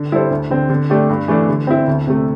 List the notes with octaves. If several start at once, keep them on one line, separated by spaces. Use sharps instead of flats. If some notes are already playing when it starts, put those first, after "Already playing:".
Already playing: D3
G3 E4 A4 C5
D2
D3 C4
D3
A3 D4 G4
G2
E3 A3 D4
D3
C4 E4
D2
C3 A3